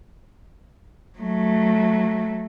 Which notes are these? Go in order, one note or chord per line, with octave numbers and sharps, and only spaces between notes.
F#3 A3